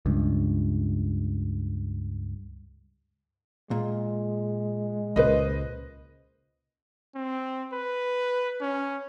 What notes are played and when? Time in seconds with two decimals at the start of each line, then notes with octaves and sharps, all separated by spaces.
0.06 C#2 G2
3.71 A#2 G#3
5.16 C#2 A#2 B4 C5 D#5
7.15 C4
7.73 B4
8.61 C#4